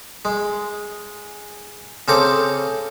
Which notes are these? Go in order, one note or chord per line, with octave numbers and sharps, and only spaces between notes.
G#3
C#3 C4 A4 A#5 D6